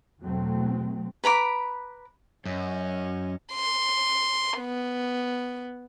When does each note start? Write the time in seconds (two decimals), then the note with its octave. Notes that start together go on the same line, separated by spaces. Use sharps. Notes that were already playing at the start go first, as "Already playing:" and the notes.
0.23 E2 B2 F#3 A3 C4
1.24 B4 A#5 B5 D6
2.46 F#2 C#4 D#5
3.53 C6
4.59 B3